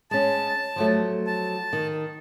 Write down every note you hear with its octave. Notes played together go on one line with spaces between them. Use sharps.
G#3 C#4 A5
F3 F#3 A3
A5
D#3